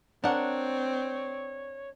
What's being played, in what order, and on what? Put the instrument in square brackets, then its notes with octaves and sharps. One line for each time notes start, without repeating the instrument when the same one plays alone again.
[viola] C4 [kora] D4 [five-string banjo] A#4 F#5 [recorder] C#5